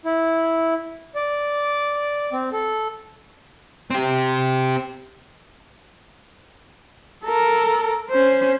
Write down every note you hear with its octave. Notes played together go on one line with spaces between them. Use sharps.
E4
D5
C4
A4
C4 G4
A4 A#4
C#4 C5